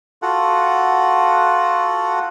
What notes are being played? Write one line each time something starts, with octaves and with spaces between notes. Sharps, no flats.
F4 F#4 A4 F#5